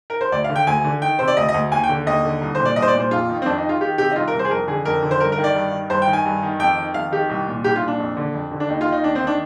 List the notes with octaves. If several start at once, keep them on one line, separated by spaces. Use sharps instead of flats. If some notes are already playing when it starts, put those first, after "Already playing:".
A#4
C5
D2 D5
F5
D3
G5
D2 G#5
D3
D#3 G5
C3 C5
D5
D2 D#5
D#5
D2
D#2 G#5
G5
D3
D#2 D#5
D3
C2
A#2 C5
D5
C2 D#5
C5
D5
A#2
C5
F2 F4
D#3
C4
F2 D4
D#4
D#3
F4
D#3 G4
C3 G4
D#4
C2 F4
A#4
C2
C5
G#4
F2 A#4
D3 G#4
F2 A#4
D3
C5
G2 A#4
A#4
D#3
D5
G2
D#3
G2 C5
G5
D#3
G#5
G2
D#3
F2 G5
D#3
F2 F5
D#3 G4
C2
A#2
C2 G4
F4
A#2
D4
F2
D3
F2
D3
D4
D#2 D#4
F4
D#3
D#4
D#2 D4
C4
D#3
D4